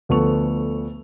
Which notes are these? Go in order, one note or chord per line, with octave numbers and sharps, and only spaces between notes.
D2 F3 B3 A4 C#6 F7